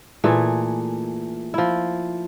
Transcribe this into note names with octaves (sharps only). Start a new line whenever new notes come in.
A#2 E3 A3 G#4
F3 E4